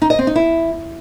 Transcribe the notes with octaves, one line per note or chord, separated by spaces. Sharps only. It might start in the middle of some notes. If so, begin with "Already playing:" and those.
D#4
D#5
C4
D#4
E4